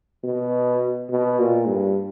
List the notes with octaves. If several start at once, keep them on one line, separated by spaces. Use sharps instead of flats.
B2
B2
A#2
G2